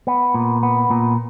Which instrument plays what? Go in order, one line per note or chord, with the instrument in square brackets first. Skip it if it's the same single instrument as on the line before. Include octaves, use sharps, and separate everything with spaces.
[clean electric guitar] B3
A#2
B3
A#2